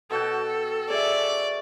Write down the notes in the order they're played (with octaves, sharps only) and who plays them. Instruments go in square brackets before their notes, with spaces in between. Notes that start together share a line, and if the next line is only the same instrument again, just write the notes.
[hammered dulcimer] B2 F#4 G5 [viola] A4
[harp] G#4 E5 [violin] D5